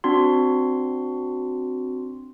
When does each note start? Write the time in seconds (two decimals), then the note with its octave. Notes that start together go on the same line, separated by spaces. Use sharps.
0.04 C4 D4 F#4 C6